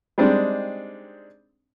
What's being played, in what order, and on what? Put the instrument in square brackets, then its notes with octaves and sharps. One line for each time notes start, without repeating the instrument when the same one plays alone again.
[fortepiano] G3 G#3 C4 D4 D#4